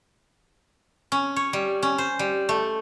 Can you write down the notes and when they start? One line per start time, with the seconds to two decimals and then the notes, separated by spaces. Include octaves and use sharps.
1.12 C#4
1.36 C#5
1.53 G3
1.83 C#4
1.98 C5
2.19 G3
2.49 A3